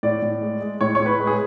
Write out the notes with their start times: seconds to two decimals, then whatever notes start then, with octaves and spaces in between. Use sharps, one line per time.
0.03 A2 D5
0.22 A2
0.42 G#3
0.61 G#3
0.81 A2 C#5
0.95 A2 C#5
1.06 B4
1.19 G#3
1.27 G#4